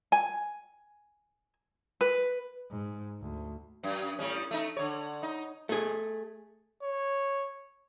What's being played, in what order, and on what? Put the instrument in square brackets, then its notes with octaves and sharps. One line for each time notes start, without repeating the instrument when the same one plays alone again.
[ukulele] G#5
B4
[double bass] G#2
D2
[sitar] F#2
A2 G3 C#4
A3 D#4
D3 C#5
D#4
[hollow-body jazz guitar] A3 G#4
[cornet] C#5